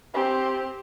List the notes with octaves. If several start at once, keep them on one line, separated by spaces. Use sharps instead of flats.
C4 G4